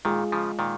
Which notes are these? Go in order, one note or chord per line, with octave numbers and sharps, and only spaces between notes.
A#2 D#3 G#3 F4 G#4
C#3 F3
A#2 D#3